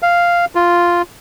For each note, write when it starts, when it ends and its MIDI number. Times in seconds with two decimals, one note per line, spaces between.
0.02 0.45 77
0.55 1.02 65